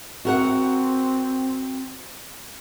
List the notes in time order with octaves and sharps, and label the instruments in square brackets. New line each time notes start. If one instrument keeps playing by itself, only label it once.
[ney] C4 [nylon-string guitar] F#4 A#4 F#5